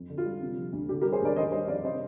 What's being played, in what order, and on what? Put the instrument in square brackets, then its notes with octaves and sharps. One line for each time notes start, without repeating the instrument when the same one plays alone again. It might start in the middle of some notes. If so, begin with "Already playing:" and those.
Already playing: [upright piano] F2
D3
F4
G3
C3
F3
D2
D3 G4
G4 A#4
G3
G#4 C5
D2 A#4 D5
D#3 C5 D#5
G3 C5 D#5
F2 D5 F5
C3 C5 D#5